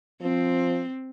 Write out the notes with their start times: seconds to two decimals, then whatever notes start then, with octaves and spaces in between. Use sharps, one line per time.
0.22 F3 C4